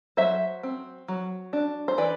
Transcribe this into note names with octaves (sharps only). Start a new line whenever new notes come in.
F#3 C5 E5
C4
F#3
D4
C5
E3 B4 D5